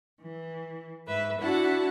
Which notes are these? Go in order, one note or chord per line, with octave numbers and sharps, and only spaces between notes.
E3
G#2 B4 E5
D4 E4 F#4 F#5 A5